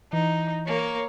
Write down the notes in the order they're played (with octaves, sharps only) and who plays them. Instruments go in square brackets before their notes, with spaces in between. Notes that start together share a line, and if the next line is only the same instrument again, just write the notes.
[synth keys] E3 [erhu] D#4
[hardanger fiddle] A#3 [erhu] C#5